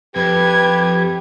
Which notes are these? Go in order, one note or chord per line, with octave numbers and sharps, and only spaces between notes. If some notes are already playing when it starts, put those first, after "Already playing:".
F2 G4 B4 G#6